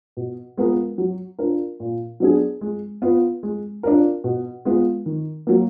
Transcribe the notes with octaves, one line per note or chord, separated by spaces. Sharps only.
B2
G#3 B3 F4 A#4
F#3
D4 F4 A#4
A#2
F#3 B3 D4 G#4
G#3
B3 F4 B4
G#3
D4 F4 A#4
B2
G#3 B3 F4
D#3
F#3 A#3